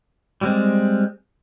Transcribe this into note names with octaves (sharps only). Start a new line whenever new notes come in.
G3 G#3 C4